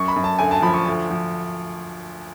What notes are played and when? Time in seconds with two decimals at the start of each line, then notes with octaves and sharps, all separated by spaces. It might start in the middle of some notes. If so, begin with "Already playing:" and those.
Already playing: F#2 C#6
0.08 B5
0.16 F#2
0.24 A5
0.39 D2 G#5
0.51 A5
0.62 F3 B5
0.74 C#6
0.87 D2
1.10 F3